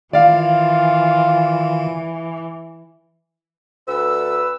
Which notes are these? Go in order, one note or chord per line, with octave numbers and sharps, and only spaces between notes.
D#3 E3 F4 D5 F5
D2 B4 E6